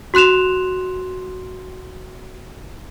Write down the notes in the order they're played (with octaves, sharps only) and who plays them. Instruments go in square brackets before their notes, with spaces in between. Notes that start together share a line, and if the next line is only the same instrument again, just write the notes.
[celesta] F#4 C6 F#6 E7 F7